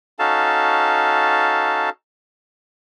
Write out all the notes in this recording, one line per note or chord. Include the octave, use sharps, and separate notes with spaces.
C#4 D#4 F#4 A4 F5 A5